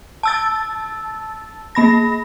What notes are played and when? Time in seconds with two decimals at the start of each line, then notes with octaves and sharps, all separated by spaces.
0.23 A5 E6 A6
1.75 A#3 B5 A#6